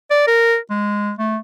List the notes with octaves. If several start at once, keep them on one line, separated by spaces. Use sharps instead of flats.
D5
A#4
G#3
A3